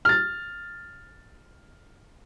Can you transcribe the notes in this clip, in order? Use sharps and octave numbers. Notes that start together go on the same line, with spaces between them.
F6 A6